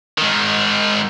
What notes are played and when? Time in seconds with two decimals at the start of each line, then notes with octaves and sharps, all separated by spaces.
0.18 G#2 D#3